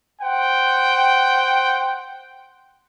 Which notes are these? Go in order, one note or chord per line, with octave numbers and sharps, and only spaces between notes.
C5 F#5 G5